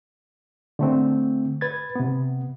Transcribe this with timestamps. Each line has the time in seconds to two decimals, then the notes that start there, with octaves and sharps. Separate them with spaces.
0.79 D3 A3 C4
1.61 B4 G#6 A6
1.96 C3 B3